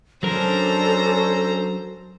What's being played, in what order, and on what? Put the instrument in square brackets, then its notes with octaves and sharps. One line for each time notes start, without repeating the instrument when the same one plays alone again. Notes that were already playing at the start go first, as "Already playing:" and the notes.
[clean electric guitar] F#3 A#4 [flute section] C#4 D4 [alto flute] A4 [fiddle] C5 A#5